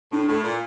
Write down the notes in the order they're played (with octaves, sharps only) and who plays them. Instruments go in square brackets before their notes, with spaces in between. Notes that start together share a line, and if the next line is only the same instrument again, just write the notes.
[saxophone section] A2 [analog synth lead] D4
[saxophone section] A2
A#2